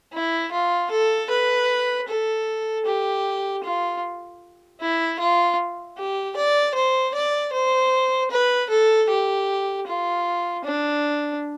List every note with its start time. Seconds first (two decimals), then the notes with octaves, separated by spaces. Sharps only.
0.13 E4
0.52 F4
0.91 A4
1.30 B4
2.08 A4
2.86 G4
3.64 F4
4.80 E4
5.20 F4
5.97 G4
6.36 D5
6.75 C5
7.14 D5
7.53 C5
8.31 B4
8.70 A4
9.09 G4
9.87 F4
10.65 D4